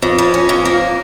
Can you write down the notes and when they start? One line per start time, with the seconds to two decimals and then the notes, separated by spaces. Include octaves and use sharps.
0.02 F2
0.18 F2
0.34 C#4
0.49 F2
0.65 A#3